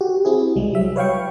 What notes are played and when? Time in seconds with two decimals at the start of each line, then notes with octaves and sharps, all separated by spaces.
0.01 F#4 G4
0.25 C4 E4 G#4
0.56 C2 G3 G#3
0.74 F#3 E5
0.96 B4 C#5 F5 G5 C#6